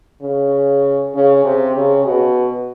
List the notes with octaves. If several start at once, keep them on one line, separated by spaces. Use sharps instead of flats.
C#3
C#3
C3
C#3
B2